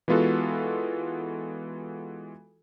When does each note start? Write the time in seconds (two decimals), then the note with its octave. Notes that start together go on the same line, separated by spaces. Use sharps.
0.08 E3 G#3 B3 F4 F#4 A4